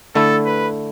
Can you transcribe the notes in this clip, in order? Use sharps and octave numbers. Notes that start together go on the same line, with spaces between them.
D3 A3 E4 A4
B4